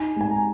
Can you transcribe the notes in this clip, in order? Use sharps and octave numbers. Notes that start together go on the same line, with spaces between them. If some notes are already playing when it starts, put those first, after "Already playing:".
Already playing: D#4 G#5
G#3 G#5
A#5